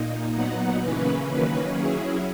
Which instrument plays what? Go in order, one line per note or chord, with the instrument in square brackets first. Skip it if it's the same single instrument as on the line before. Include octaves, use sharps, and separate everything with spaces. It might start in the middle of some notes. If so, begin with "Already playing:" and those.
Already playing: [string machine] A#2 A#3 D#4
A#2 F#3 B3 D#4 F#5
C#3 E3 A#3 C#4 B4
D#3 F#3 A#3 C#4 B4
F#3 C#4 E4 G#4